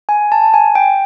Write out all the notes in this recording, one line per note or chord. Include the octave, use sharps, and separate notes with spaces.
G#5
A5
G#5
G5